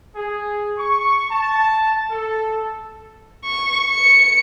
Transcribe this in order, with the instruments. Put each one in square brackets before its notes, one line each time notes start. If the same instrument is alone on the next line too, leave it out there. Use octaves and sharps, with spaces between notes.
[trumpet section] G#4
C#6
A5
A4
[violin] C#6
C#7